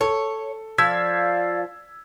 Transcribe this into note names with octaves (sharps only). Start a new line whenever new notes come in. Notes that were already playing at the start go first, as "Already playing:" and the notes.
A4 C#5
F3 D5 F5 E6 G#6 B6